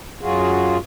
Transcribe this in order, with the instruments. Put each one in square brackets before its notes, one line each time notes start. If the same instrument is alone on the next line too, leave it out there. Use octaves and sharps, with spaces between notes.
[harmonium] F#2 F#3 F4 F#4 G#4